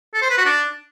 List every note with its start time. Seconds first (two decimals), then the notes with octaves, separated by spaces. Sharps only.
0.14 A4
0.22 C5
0.30 B4
0.38 F#4
0.46 D4